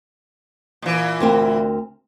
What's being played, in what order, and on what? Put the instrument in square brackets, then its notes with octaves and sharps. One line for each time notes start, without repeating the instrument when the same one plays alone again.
[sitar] A#2 E3
[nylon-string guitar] D2 C4 A#4